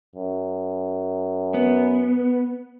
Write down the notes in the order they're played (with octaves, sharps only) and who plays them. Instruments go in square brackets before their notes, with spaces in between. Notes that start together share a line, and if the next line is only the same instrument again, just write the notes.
[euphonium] F#2
[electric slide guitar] B3